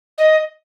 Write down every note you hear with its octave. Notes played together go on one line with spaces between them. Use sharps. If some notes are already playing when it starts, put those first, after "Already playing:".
D#5